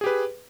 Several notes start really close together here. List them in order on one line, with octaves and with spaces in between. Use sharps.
G#4 G4 B4